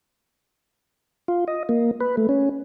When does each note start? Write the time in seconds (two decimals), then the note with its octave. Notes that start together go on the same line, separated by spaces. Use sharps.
1.28 F4
1.48 D#5
1.69 A#3
2.00 B4
2.17 A3
2.29 C#4